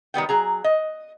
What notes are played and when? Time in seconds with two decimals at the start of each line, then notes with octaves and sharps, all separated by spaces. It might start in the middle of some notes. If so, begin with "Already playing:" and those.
0.14 D#3 G3 B3 G5
0.29 F#3 G#4 A#5
0.64 D#5